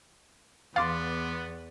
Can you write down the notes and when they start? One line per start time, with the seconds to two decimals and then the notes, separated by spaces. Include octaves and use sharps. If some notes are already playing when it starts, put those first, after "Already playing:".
0.76 E2 B3 F5 C6 D6 A6